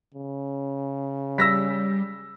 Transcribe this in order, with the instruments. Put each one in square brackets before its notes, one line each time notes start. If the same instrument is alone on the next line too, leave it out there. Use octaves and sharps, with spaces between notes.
[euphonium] C#3
[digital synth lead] G3 [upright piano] E6 A#6 B6